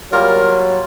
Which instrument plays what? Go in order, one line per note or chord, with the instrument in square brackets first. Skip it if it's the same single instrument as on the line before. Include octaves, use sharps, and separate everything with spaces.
[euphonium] F#3 [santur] G3 A#3 F4 [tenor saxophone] A#4